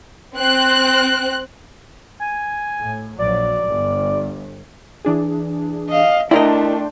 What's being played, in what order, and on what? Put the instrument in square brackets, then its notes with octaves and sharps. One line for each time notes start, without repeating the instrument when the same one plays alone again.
[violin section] C4 F#6
[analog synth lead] G#5
[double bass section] A2
[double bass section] A#1 F#3 [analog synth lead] D5
[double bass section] G1
[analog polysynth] E3 D4 G#4
[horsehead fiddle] D#5 F5
[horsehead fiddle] A3 D4 [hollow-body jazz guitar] E4 A#4 D#5 [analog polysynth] D5 G5 C6